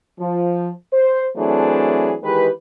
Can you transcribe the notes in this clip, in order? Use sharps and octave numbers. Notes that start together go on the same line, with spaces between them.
F3
C5
E3 F#3 A3 C4 D4 G#4
D#3 E3 G#3 G4 B4